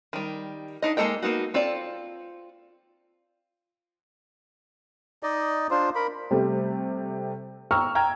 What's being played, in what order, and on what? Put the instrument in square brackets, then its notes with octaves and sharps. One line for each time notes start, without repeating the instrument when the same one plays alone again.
[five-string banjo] D#3 G3
D4 D#4 D#5
G#3 A#3 A4 D#5 G5
A#3 B3 D#4 F#4
C4 F4 A4 D5
[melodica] D#4 D5 D#5
D4 F4 C5
A#4 B5
[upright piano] C3 G3 A3
G5 A#5 C#6 E6 F6
G5 A#5 F6 G#6